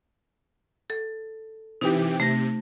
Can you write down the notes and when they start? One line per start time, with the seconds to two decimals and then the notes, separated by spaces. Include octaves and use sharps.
0.90 A4
1.81 C3 E3 D#4 G4
2.20 C3 A3 A#6